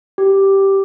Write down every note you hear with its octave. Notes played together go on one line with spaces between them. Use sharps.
G4